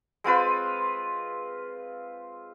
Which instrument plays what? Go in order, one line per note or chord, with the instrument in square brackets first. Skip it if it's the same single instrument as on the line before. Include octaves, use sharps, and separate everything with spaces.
[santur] G#3 C4 F4 B4